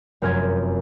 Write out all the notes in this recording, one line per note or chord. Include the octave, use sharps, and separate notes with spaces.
F1 F#2 A#4 G#5 C6 G#6